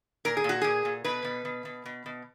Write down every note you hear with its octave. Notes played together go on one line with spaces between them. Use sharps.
A#2 A#4
G#4
A#2 F#4
A#2 G#4
A#2
B2 B4
B2
B2
B2
B2
B2